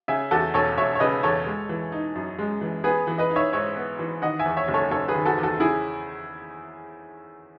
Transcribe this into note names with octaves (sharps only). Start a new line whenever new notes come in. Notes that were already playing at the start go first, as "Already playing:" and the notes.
C#3 E5 G#5
E2 F#4 A4
E1 A4 C#5
E1 C#5 E5
C#5
C#3 B4 D#5
E2 A4 C#5
G#3
E3
D#4
F#2
G#3
E3
B3 G#4 B4
E3
B4 D#5
D#4
C#5 E5
G#2 C#5 E5
B3
E3
D#3 D#5 F#5
E5 G#5
E2
C#5 E5
F#1
A4 C#5
F#1 A4 C#5
G#4 B4
D#3
F#4 A4
E2
F#4 A4
C#3 E4 G#4